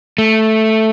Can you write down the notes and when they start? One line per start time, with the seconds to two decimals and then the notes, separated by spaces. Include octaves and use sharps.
0.18 A3